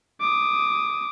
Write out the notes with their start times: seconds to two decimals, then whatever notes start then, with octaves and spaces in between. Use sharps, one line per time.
0.21 D6 D#6